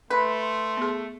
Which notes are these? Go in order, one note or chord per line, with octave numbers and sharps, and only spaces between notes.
A3 B4 C6
C6
B3 G#4